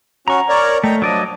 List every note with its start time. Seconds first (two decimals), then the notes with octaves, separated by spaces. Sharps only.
0.28 C#4 F#4 A#5 C#6
0.49 A#4 C#5 D5
0.84 A3 D#5 G5 A#5
1.02 F3 F#3 D4 D5 D#5